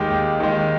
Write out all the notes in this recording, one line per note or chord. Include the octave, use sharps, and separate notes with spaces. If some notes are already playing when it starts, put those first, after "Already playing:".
Already playing: D#2 D#3 G#3 G4
D#2
D#3 G#3